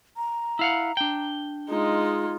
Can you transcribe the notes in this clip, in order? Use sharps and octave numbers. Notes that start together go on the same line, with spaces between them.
A#5
E4 F5 F#5
D4 G5
G#3 D#4 F4